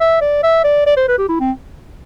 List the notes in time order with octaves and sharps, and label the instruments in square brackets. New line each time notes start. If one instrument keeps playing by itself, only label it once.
[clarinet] E5
D5
E5
D5
D5
C5
B4
G4
E4
C4